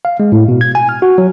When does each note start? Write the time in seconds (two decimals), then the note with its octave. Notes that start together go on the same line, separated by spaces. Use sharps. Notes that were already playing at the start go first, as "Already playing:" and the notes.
0.05 F5
0.20 G#3
0.32 A2
0.48 B2
0.61 G#6
0.75 G#5
0.89 F6
1.02 F#4
1.18 F#3